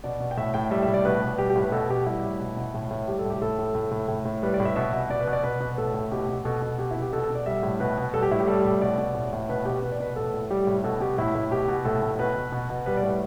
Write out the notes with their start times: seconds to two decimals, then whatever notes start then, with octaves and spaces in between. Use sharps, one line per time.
0.04 B2 D5
0.20 B2
0.31 G5
0.37 A2 E5
0.54 A2 G5
0.71 G3 E5
0.83 E5
0.88 A2
0.94 D5
1.05 B2 B4
1.21 B2
1.38 G3 G4
1.50 G4
1.56 A2
1.62 B4
1.72 B2 A4
1.90 B2 G4
2.06 G3 E4
2.23 A2
2.40 B2
2.57 B2
2.74 A2
2.91 A2
3.08 G3 G4
3.19 A4
3.25 A2 G4
3.41 A2 A4
3.58 A2
3.75 A2
3.91 A2
4.08 A2
4.25 A2
4.43 G3 B4
4.54 D5
4.60 A2
4.65 E5
4.76 B2 E5
4.93 B2
5.10 B2 D5
5.21 B4
5.27 B2
5.33 D5
5.44 B2 B4
5.60 B2
5.78 A2 A4
5.94 A2
6.11 B2 G4
6.29 B2
6.45 B2 A4
6.62 B2
6.78 B2 G4
6.91 E4
6.96 B2
7.02 G4
7.13 B2 A4
7.23 A4
7.30 B2
7.35 D5
7.46 G3 E5
7.63 A2
7.80 B2 B4
7.97 B2
8.14 G3 A4
8.23 G4
8.31 A2 E4
8.40 G4
8.47 G3 A4
8.65 A2
8.81 B2 D5
8.98 B2
9.15 A2
9.33 A2
9.49 B2 B4
9.65 B2 G4
9.83 B2 B4
9.92 D5
10.00 B2 B4
10.16 A2 A4
10.34 A2
10.50 G3 G4
10.67 A2
10.84 B2 A4
11.00 B2 G4
11.18 A2 E4
11.35 A2
11.51 B2 G4
11.68 B2
11.85 A2 A4
12.02 A2
12.19 B2 B4
12.35 B2
12.52 B2
12.70 B2
12.86 G3 B4
12.97 D5
13.03 A2